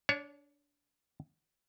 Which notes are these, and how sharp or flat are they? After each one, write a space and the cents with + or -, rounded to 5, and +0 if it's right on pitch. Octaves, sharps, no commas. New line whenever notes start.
D4 -20 C#5 +15 A5 -35